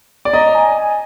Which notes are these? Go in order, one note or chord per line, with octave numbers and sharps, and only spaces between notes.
D5
D#5 A#5
G#5
G#5